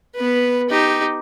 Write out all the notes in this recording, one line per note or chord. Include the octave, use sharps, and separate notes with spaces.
B3 B4
D#4 G4